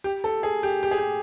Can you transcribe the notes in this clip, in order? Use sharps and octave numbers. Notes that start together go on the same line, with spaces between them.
G4
A4
G#4
G4
G4
G#4
G4